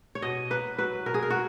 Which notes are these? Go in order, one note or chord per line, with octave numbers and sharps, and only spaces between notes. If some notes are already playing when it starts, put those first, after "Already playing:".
C#5
B2 D#5
A#3 B4
F#3 B4
B2 A#4
G#4
A#4
F#4